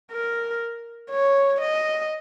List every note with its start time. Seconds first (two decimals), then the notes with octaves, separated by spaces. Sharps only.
0.12 A#4
1.11 C#5
1.61 D#5